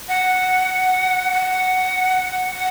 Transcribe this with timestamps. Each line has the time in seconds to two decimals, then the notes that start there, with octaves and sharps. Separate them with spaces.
0.09 F#5
1.32 F#5
2.55 F#5